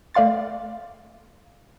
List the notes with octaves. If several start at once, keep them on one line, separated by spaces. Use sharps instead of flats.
A3 D5 F5 C6 A6